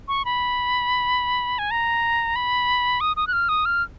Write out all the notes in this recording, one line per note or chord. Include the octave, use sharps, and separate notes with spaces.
C#6
B5
G#5
A#5
B5
D#6
D#6
F#6
F6
D#6
F6